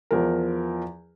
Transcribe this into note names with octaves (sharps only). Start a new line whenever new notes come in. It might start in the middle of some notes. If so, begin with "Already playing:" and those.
E2 F3 A#4